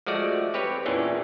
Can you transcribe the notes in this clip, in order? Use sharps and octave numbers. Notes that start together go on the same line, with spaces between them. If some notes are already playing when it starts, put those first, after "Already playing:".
F3 G#3 A3 F#4 D5
C4 G4 B4 C#5
E2 A#2 E3 C#4 D4